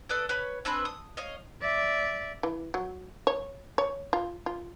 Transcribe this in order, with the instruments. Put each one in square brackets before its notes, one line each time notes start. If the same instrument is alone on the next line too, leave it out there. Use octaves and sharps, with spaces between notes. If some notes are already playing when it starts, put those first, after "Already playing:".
[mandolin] A4 B4 D5 D#6
B4 C#5 B5
C4 D4 B4 G#5
D#6
C#5 D#5 F5
[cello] D5 E5
[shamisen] E3
F#3
C#5
C#5
F4
F4